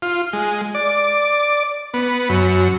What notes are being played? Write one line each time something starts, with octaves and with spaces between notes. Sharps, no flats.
F4
G#3
D5
B3
F#2